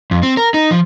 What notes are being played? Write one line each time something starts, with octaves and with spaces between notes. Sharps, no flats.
F2
C4
A#4
D#4
F3